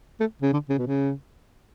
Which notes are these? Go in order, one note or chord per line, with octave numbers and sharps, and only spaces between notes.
A3
C#3
D3
C#3
B2
C#3